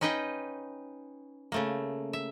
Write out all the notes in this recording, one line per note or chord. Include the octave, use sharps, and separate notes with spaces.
C#4 D#4 B4 D#5 G5
C#3 A3 A#3
E5